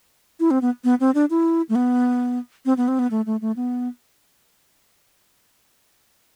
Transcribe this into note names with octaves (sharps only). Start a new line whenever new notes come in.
E4
C4
B3
B3
C4
D4
E4
A3
B3
C4
B3
C4
B3
A3
A3
A3
B3